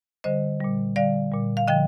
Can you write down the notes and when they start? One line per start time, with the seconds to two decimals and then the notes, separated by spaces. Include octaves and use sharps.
0.24 D3 G3 C5 D#5
0.60 A#2 G3
0.96 D3 G3 D5 F5
1.32 A#2 G3
1.57 F5
1.67 D3 F3 D#5 G5